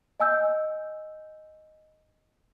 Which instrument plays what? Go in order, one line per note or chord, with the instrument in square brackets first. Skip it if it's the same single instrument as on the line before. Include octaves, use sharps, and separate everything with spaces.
[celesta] D#5 G#5 E6 G6